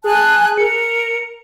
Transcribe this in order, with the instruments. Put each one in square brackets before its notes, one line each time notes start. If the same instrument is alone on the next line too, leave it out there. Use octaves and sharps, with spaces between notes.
[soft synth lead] G#4 [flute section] G#5 A5 F#6
[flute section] A#4 [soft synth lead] C#7